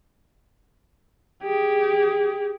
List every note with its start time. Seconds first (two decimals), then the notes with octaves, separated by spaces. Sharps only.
1.43 G4 G#4